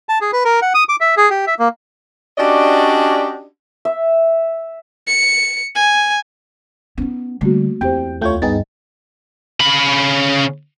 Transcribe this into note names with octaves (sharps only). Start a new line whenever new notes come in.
A5
G#4
B4
A#4
F#5
D#6
D6
E5
G#4
G4
E5
A#3
C#4 D4 F#4 G4 D5 D#5
E5
C#7
G#5
B3 C#4 D#4
D3 G3 A3 A#3 F#4
E2 C4 G4 C5 G5
D2 A3 F4 C#5 G5 G6
G2 B3 D#4 G#4 D#5 G5 A6
C#3 B5